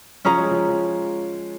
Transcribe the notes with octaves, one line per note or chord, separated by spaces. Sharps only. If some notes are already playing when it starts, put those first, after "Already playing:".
F3 C#4 G#4 C#5 A#5
G#3
F3
F3